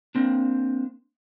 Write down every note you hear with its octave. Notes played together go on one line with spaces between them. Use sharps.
A#3 C4 D4